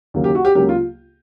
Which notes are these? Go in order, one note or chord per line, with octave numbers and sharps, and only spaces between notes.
D#2 C#3 F#3 A#3
G4
F#4
G4
C#2 C#3 F#3 A#3 G4
F4